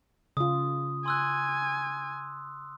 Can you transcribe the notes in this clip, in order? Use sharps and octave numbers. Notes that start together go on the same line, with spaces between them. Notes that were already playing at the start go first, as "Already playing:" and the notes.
C#3 F4 D#6
G#5 C6 E6 F#6